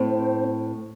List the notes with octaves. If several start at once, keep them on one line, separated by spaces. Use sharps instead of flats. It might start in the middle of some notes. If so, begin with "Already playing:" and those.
Already playing: A2 C4